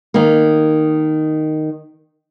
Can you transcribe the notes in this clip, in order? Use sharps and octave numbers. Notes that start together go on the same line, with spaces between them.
D#3 A#3